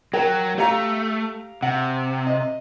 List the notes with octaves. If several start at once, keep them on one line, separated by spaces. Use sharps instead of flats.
F#3 A#4 G5
A3 G4 F5 A#5
C3 F#5
D#5